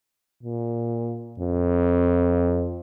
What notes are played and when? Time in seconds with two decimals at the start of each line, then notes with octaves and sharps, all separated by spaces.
0.43 A#2
1.39 F2